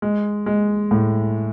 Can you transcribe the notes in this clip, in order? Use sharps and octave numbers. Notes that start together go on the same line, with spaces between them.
G#3
G#3
A2